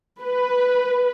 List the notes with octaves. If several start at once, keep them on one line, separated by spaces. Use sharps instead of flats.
B4